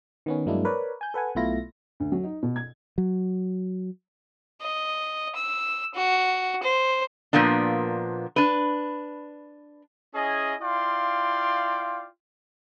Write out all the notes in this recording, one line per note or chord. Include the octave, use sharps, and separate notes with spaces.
D#3 B3 C#4
G2 F#3 G#3 A#3 D4 E4
A#4 B4 C#5 D5
G#5 G6
A4 B4 F#5 G#5
B1 B2 A3 E4 F4 A#6
D2
F#3
D#4
B2
G#6
F#3
D#5
E6
F#4
C5
A#2 F3 A#3 B3 D4
D4 B4
C#4 E4 G#4 D#5 G#5
E4 F4 D5 F5 G5 C6